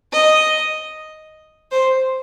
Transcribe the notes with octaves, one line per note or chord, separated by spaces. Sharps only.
D#5
C5